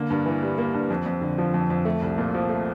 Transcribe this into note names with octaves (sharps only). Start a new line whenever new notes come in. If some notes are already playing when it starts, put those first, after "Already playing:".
Already playing: D3 A#3
G2
E3
G3
A#3
G2
F2
F2
D3
F3
F2
F2
A3
C2
A#2
F3
A3